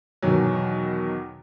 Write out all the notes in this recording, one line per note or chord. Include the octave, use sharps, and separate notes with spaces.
E2 B2 D#3 F#3